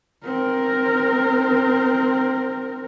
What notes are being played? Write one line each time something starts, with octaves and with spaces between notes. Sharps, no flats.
C4 A#4